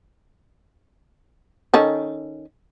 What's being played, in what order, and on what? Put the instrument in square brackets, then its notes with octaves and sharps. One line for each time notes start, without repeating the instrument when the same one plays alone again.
[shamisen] D#3 C#4 A4